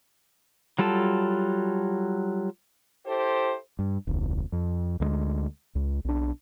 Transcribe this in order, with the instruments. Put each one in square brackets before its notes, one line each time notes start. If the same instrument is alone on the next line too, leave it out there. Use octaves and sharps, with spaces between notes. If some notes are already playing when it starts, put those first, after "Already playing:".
[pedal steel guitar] F#3 G3 F4 A4 A5
[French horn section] E4 G4 A4 C5
[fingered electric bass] G2
E1 C#2
F2
D2 F#3 G#3
C#2
B1 D4